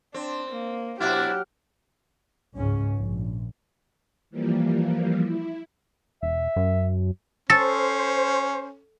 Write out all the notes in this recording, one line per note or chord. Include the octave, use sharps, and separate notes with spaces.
C4 D4
A#3
B2 F#3 D4 E4 G4 F#5 F6
C#2 G#2 C#4
A#1
E3 F3 G3 A#3
E4
E1 E5
F#2
C#4 A4 C5 A6